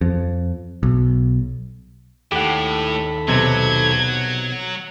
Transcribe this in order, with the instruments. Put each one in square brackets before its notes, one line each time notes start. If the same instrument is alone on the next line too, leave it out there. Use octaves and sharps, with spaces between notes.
[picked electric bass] F2
B1
[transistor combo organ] D#2 A4 B5 [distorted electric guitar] A2 [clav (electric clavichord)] G4 F#5
[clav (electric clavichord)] B1 C3 [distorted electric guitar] F#3 [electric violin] G#6